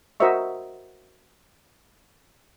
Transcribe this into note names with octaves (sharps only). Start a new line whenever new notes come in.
F#4 A#4 C5 D#5 E5 C#6